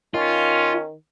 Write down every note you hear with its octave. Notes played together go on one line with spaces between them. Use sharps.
D#3 C#4 F4